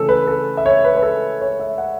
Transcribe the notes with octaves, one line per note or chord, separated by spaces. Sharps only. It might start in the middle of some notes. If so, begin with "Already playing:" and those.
Already playing: C#3 E3 A3 C#4 A4
B4
A4
E5
C#5
B4
B4
A4
C#5
E5
F#5